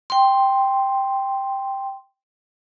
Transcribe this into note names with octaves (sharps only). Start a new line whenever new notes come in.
G5 C6